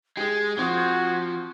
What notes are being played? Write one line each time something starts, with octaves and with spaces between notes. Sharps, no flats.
G#3 G4 G#4 G#6
F3 C4 F#4 D#6